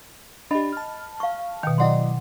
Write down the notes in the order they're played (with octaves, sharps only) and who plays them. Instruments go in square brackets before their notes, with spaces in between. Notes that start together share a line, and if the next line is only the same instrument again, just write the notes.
[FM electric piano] D4 G4 [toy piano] D#5 B5
[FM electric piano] A5 F6
[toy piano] F5 C#6
[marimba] B2 D#3 [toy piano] G5
[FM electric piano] F#3 D5 D#5 [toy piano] E4 F#5 C6